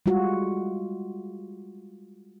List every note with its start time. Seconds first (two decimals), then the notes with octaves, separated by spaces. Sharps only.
0.06 G3 G#3 F4 F#4